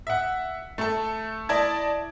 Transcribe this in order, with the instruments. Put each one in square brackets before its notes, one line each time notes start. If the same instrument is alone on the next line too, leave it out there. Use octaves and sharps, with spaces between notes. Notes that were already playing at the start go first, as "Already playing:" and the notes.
[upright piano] E5 F#5
A3 A4
[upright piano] E4 D#5 [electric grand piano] D5 A5 G#6